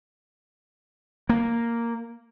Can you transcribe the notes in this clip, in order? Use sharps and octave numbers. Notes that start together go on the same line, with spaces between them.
A#3